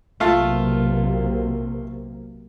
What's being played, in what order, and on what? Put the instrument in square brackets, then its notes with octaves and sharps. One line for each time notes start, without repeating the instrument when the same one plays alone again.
[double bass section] B1 C3 A#3 [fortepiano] A3 F4